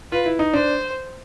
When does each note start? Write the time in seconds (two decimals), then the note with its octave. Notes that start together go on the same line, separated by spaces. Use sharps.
0.12 F4 B4
0.26 E4
0.39 D#4
0.53 D4 C5